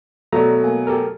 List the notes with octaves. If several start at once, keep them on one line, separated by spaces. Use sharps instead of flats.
B2 F#3 A3 A4 D5 A#5
A#3 G#5
G4 A4 A#4